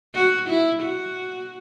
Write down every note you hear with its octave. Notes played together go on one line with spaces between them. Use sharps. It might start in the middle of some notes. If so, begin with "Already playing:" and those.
F#4
E4
F#4